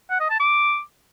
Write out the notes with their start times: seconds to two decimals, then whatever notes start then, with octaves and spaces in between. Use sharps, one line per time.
0.10 F#5
0.20 D#5
0.30 A5
0.40 D6